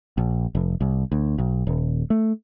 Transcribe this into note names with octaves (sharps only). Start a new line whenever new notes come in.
A#1
F1
C2
D2
B1
D#1
A3